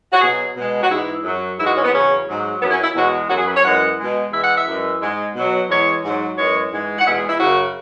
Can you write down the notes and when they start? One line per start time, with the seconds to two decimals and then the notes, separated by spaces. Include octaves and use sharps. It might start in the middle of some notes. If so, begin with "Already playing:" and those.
0.12 F#4
0.21 B2 F#3 G#4
0.56 B2 G#3
0.82 F#4
0.91 G#2 E3 G#3 E4
1.24 F#2 F#3
1.58 G#2 E3 G#3 E4
1.67 F#4
1.75 C#4
1.85 B3
1.92 E2 C#3 F#3 C#4
2.28 G#2 F#3
2.61 F#3 B3
2.65 F#2 E4
2.73 C#4
2.83 E4
2.95 E2 B2 G#3 F#4
3.29 F#2 F#3 F#4
3.38 G#4
3.46 B4
3.56 C#5
3.64 F#2 E3 G#3 F#5
3.98 B2 G#3
4.32 E2 E3 G#3 E5
4.44 F#5
4.57 E5
4.67 F#2 E3 G#3
5.01 G#2 G#3
5.35 B2 F#3
5.69 E2 E3 G#3 C#5
6.03 G#2 F#3
6.37 F#2 E3 G#3 C#5
6.71 G#2 E3 G#3
6.98 F#5
7.05 E2 B2 G#3 E5
7.17 G#4
7.29 E4
7.40 F#2 C#3 F#3 F#4